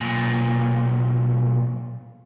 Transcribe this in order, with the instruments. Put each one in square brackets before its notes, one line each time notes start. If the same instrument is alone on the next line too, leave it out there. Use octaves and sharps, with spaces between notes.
[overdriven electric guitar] B1 A#2